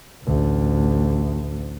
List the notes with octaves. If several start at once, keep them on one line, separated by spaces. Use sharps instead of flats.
A1 D2